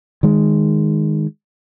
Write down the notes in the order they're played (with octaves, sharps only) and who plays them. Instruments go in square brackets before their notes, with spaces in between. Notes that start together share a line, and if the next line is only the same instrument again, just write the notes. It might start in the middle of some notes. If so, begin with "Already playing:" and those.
[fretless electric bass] D#3 G#3